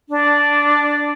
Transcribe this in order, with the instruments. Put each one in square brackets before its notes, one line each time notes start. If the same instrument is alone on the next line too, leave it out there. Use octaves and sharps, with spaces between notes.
[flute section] D4